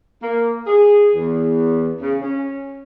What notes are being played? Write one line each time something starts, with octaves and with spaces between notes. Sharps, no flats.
A#3
G#4
E2
C#3
C#4